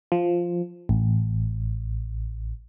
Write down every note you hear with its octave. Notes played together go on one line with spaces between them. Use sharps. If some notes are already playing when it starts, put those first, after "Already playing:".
F3
A1